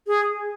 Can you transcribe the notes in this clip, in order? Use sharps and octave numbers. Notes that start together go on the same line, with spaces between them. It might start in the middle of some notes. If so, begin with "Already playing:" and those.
G#4